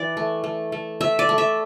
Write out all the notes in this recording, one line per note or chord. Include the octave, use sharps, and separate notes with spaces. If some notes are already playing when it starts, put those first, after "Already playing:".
Already playing: E3 D5
A3
A3
A3
A3 E5
D5
A3
E5